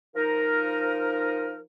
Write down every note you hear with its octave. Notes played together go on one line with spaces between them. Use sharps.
F3 D#4 A#4